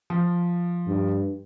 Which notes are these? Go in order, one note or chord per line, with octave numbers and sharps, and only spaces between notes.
F3
G2